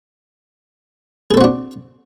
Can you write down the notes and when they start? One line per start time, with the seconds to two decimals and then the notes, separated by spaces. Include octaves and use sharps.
1.31 G#4
1.34 A4
1.37 C4
1.41 F#4
1.44 D4